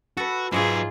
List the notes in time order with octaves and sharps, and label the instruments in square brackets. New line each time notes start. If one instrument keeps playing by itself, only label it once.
[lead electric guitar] F#4 [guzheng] A4 B4
[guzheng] G#2 D#4 E5 [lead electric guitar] F#3 B4 [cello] F4 [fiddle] G#4